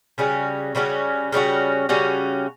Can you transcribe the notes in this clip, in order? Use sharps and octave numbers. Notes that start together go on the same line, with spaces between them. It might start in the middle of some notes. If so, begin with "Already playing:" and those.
C#3 G3 C#4 F#4
C#3 G3 C#4 F#4
C#3 G3 C#4 F#4
C#3 G3 C#4 F#4